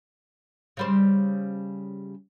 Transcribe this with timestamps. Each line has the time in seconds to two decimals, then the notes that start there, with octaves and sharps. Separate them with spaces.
0.77 C#3 G3 C5